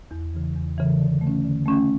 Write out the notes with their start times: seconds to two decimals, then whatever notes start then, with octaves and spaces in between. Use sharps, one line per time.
0.11 E2
0.34 C#3 E3
0.56 E2
0.78 C#3 E3
1.00 D3
1.21 A3
1.27 C#4
1.45 D3
1.66 A3 C#4